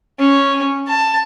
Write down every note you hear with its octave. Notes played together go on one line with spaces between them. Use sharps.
C#4
A5